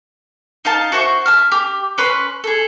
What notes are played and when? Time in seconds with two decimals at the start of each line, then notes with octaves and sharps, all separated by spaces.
0.65 D#4 F4 A5
0.92 F#4 C5 E5 C#6
1.26 E5 A5 F6
1.52 G4
1.98 C#4 B4 C6
2.44 G#4 A4